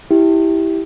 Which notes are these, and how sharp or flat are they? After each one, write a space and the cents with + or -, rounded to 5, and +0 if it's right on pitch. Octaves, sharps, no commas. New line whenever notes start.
E4 -10 G4 +0